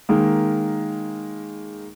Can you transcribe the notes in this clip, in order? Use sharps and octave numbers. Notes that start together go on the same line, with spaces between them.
D#3 G#3 A#3